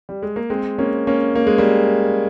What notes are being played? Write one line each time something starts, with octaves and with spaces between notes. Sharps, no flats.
G3
G#3
A#3
G#3 C4
A#3 C#4
A#3 C#4
A#3
G#3
G3 A#3